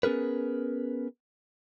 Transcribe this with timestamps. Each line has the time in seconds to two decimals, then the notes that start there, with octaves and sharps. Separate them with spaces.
0.03 B3 C#4 G#4 A#4 B4